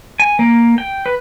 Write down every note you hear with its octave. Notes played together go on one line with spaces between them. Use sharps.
G#5
A#3
G5
B4